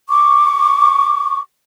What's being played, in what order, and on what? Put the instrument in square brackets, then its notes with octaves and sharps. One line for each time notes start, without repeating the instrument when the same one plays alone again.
[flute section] C#6 D6